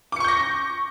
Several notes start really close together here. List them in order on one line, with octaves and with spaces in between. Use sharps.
D6 C#7 C#6 G6 A#6